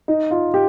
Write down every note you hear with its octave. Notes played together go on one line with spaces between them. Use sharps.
D#4
F4
G4